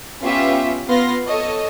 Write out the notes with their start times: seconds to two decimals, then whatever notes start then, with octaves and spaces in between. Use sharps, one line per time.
0.20 B3 C#4 F4 G4 E5
0.86 B3 F4 F5 C6 A#6
1.25 A4 C#5 D#5